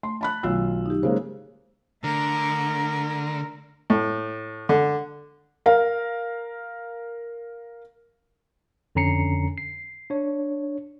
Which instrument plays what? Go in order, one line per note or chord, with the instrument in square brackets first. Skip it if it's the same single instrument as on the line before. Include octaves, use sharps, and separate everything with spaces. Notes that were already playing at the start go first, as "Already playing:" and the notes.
[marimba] A3 [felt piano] C6
[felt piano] A5 B5 F#6
[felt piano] B1 F4 E6 [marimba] D#3 F#3 A3
[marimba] D#4 G4
[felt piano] C#3 G#3 A#3 [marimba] C5
[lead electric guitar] D3 [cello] A3 A#4
[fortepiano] A2
D3
[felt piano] A#4 F5
[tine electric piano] F2 D3 C#4 A#5 C7 C#7
C7
D4 C#5